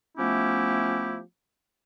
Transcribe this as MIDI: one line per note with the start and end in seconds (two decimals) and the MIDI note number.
0.16 1.18 53
0.16 1.18 57
0.16 1.18 59
0.16 1.18 61
0.16 1.18 64
0.16 1.18 67